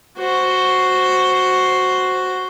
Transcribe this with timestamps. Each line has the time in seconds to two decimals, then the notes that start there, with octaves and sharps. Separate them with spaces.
0.17 F#4 C5